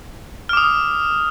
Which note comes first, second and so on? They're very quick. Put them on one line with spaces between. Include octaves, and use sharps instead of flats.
F6 D6 D#6